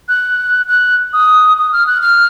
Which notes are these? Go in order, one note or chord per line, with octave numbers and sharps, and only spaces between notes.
F#6
F#6
D#6
D#6
F6
F#6
F6